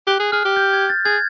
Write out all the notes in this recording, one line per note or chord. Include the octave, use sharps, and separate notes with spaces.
G4 F#6
G#4
G#4 F6
G4
G6
G#6
A6
G#4 G#6